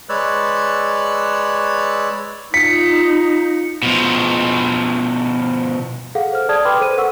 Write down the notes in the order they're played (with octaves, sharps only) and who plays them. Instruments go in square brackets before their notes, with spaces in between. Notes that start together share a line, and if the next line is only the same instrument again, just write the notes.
[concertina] G#3 B4 C#5 D5 E6 F#6
[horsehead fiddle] D#4 [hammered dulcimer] F4 [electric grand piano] B6 [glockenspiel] C#7
[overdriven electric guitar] B2 F3
[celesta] G#4 A4 F5 F#5
C5 F6
G#4 D5 A5 D#6 F6 G#6
B4 G5 B5 C6 D6 F6
A4 C5 D#7
A#4 F#5 C#6 E6